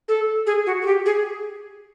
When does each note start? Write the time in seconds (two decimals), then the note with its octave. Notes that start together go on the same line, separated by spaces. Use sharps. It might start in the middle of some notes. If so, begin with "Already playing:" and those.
0.08 A4
0.47 G#4
0.66 F#4
0.82 G#4
0.86 G4
1.06 G#4